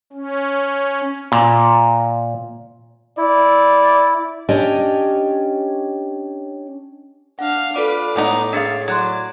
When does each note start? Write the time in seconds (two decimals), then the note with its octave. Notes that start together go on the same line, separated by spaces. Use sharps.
0.12 C#4
1.32 A#2
3.18 E4 D5
4.49 C#4 D4 G4 C#5 D#5
7.39 D4 F5 F#5
7.76 D4 F4 A4 B4 D5 D6
8.16 A2 G#3 B3 D#4
8.53 D4 G#4 E5 F5 A6
8.88 F#3 D5 C6 F#6 G#6